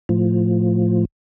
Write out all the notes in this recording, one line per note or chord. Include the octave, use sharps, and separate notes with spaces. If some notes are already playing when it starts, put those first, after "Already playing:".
A2 F3